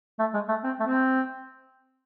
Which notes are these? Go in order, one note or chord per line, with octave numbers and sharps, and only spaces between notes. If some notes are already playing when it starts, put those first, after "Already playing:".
A3
G#3
A3
C4
A3
C4